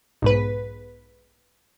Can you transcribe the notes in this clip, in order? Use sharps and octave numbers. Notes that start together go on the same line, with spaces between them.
B1 G#2 B4